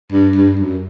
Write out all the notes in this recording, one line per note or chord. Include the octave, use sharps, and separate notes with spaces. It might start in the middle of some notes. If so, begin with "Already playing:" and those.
G2
G2
F#2